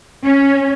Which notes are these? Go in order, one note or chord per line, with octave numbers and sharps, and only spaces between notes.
C#4